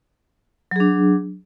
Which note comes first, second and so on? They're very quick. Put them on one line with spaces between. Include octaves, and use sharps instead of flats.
F#3 G#4 D4